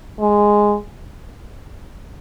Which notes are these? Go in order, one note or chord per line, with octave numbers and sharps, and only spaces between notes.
G#3